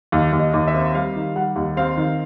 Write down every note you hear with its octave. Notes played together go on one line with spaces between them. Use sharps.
D#2
D#2
D#5
D#2
E5
C4
G3 F5
D#3
G3 F#5
D#2
C4 F5
D#3